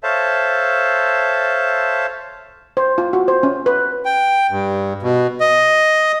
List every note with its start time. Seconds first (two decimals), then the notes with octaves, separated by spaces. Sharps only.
0.03 A4 C5 C#5 E5 F5 A5
2.77 C5
2.98 F4
3.13 F#4
3.28 C5
3.43 C#4
3.66 B4
4.05 G5
4.50 G2
5.03 B2
5.40 D#5